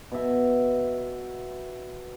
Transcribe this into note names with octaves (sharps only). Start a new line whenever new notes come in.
B2 E5